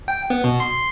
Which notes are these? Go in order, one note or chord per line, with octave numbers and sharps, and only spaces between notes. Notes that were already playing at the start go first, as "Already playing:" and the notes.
G5
B3
B2
C6